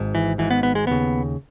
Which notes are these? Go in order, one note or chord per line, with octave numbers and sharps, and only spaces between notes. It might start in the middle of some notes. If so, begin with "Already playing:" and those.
Already playing: G#1 G#2
E3
G#1 G#2 E3
B3
B3
G#3
E1 D#2 C#3 B3